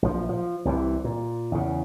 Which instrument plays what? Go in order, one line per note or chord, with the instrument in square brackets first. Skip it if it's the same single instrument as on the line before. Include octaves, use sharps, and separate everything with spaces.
[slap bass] A#1 F3
F3
C2 C3 D#3 E3
A#2
E2 C#3